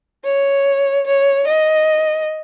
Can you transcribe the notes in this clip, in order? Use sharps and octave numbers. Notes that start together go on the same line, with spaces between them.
C#5
C#5
D#5